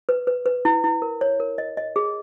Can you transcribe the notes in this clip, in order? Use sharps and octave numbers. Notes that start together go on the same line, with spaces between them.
B4
B4
B4
E4
E4
A#4
C#5
A#4
D#5
D#5
G#4